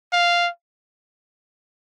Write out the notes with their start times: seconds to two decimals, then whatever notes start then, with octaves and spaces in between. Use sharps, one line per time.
0.13 F5